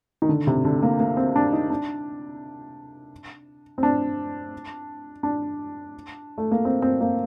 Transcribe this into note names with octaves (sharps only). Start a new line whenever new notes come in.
D#3
D3
C3
D3
A#3
A#3
C4
D4
D#4
D4
C4
D4
D4
A3
A#3
C4
C4
A#3